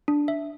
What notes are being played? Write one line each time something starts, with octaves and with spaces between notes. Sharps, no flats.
D4
E5